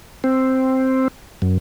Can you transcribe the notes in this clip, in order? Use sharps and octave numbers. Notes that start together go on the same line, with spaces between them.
C4
F#2